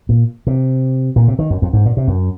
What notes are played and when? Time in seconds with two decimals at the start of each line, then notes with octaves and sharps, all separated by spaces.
0.09 A#2
0.47 C3
1.16 A#2
1.28 C3
1.39 D#3
1.50 F#2
1.62 F2
1.73 G#2
1.86 A#2
1.97 C3
2.08 F#2